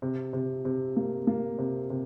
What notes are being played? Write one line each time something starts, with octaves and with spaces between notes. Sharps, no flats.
C3
C3
C3
A#3
A#3
C3
C3